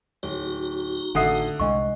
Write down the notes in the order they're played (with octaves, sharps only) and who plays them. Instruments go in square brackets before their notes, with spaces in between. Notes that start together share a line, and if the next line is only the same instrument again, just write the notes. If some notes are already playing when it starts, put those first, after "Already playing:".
[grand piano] D1 [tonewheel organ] D#4 F#4 [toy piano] C#5
[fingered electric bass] G#1 A2 [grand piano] D3 D#6 C7 [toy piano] E5 G5
[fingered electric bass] C2 C3 G#3 [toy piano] D4 D#5 C#6